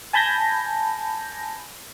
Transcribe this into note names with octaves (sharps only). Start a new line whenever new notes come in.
G#5 A5 B5 G6 G#6 A#6